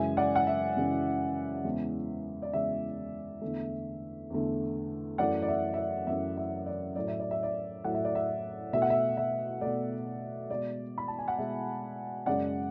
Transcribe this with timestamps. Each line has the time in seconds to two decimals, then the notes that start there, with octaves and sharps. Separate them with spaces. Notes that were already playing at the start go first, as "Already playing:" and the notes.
Already playing: F#2 C#3 E3 G#3 E5 G#5
0.17 D5 F#5
0.36 F#5
0.47 E5
0.77 F#2 C#3 E3 G#3
1.64 E2 C#3 E3 G#3
2.42 D5
2.53 E2 C#3 E3 G#3 E5
3.41 E2 D3 A3
4.30 E2 D3 A3
5.18 F#2 E3 A3 D5 F#5
5.42 D5
5.48 E5
5.74 E5
5.78 D5
6.07 F#2 E3 A3 E5
6.37 E5
6.66 D5
6.96 A2 F#3 A3 D5
7.08 E5
7.20 D5
7.31 E5
7.43 D5
7.84 A2 F#3 A3 F#5
7.94 E5
8.05 D5
8.15 E5
8.73 B2 A3 E5
8.82 F#5
8.90 E5
9.17 E5
9.61 B2 A3 D5
10.50 B2 G#3 D5
10.98 B5
11.08 A5
11.18 G#5
11.28 F#5
11.38 B2 G#3 E5
12.26 F#2 C#3 G#3 D5 F#5